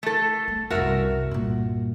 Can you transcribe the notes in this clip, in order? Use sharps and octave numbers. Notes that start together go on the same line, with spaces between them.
A3 A4
A3
C2 F#2 F#4 A#4 E5
G2 A#2